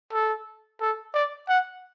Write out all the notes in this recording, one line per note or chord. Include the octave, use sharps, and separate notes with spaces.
A4
A4
D5
F#5